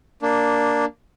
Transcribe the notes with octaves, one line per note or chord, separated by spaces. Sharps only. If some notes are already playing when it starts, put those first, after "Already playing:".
A#3 D4